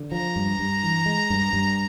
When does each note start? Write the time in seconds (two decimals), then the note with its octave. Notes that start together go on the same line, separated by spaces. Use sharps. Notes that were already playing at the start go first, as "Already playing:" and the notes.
Already playing: D3
0.12 F3 A#5
0.36 G2
0.59 G2
0.83 E3
1.06 G#3
1.30 G2
1.53 G2